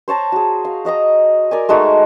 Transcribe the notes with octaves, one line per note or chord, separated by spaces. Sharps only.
C5 C#5 A5 A#5
F#4 G#4
F5
F#4 D#5 A#5 D#6
A#4 D5 G#5
G#3 A3 D#4 F#4